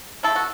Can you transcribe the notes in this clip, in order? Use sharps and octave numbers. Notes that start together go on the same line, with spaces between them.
C#3 A3 E4 A4
F#4